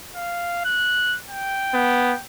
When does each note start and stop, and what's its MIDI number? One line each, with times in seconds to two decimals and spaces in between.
0.16 0.61 77
0.65 1.17 90
1.30 2.23 79
1.74 2.14 59